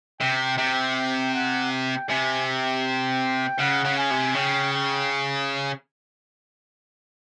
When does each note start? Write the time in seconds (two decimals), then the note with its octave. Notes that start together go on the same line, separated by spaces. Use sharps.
0.21 C3 G5
0.57 C3 G5
0.95 G5
1.34 F#5
1.71 G5
2.09 C3 G#5
2.47 G5
3.60 C#3 F#5
3.85 C#3
3.98 G#5
4.10 C3
4.35 C#3 G5
4.73 G5